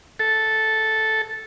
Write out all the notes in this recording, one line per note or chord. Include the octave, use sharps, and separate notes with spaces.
A4